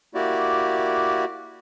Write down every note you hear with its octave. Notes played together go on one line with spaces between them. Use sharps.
A#3 E4 F#4 G4 D5